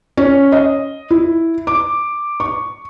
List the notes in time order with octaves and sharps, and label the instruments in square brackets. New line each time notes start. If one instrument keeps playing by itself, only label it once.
[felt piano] C#4
D#5
E4
D6
C#6